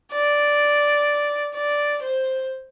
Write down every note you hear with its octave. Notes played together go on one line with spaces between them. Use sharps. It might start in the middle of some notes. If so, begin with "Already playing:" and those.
D5
D5
C5